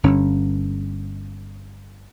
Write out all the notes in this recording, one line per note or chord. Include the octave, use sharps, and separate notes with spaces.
G1 C#4